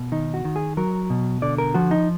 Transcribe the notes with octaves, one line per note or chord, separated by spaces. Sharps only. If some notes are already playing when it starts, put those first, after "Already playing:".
Already playing: B2
D#3 D#4
F#4
D#3
G#4
F#3 A#4
B2
D3 D5
A#4
F3 F#4
D#4